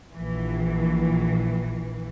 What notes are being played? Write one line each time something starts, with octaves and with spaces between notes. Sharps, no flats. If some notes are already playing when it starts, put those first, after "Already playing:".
A#1 E3